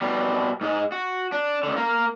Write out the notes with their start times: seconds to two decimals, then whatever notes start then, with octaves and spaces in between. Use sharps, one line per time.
0.02 B2 G3
0.61 G#2 G#3
0.92 F#4
1.32 D4
1.63 C#2 D3
1.77 A#3 A#4